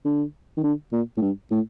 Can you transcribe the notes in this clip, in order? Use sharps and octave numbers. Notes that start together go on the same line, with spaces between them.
D3
D#3
D3
A#2
A2
G2
A2